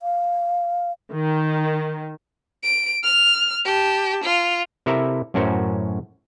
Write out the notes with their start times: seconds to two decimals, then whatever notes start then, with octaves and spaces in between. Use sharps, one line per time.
0.01 F5
1.12 D#3
2.63 D7
3.03 F6
3.65 G4 A5
4.24 F4
4.86 C3 E4 A4 A#4 E5 A#5
5.34 F#2 A2 C#4 F#4 A#4 C5